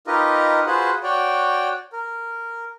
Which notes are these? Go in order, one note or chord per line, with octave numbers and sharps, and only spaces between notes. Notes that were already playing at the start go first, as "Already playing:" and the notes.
D#4 F4 G4 A#4 B4 D#5
F4 F#4 G#4 B4 C5 F#5
F#4 C#5 D5 G5
A#4